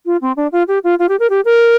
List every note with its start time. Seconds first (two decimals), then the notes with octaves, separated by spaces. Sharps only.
0.06 F4
0.21 C4
0.37 D4
0.52 F4
0.68 G4
0.84 F4
0.99 F4
1.09 G4
1.20 A#4
1.30 G4
1.45 A#4